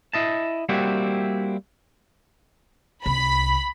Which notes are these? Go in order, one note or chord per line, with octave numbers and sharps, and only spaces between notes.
E4 D#5 A5
G3 A#3 C4 E4 F#4 G4
C2 B5